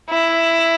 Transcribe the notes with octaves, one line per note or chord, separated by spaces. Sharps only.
E4